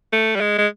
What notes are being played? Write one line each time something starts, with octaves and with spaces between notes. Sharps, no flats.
A3
G3
G#3
G#3